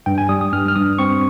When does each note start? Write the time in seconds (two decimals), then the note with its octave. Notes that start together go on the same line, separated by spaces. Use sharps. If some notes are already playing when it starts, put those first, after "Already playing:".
0.06 G2 G5
0.18 G#5
0.29 G3 D#6
0.41 D#6
0.52 G2 F6
0.68 F6
0.76 G2 D#6
0.99 C4 C#6